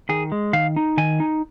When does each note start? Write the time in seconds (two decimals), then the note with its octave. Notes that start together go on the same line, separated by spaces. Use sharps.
0.09 D#3 G#4
0.32 G#3
0.53 D#3 F5
0.76 D#4
0.97 D#3 G#5
1.20 D#4